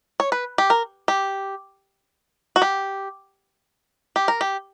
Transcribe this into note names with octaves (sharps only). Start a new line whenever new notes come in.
C#5
B4
G4
A#4
G4
F#4
G4
G4
A#4
G4